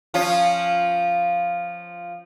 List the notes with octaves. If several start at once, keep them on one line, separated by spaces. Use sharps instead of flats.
F3 C#4 F4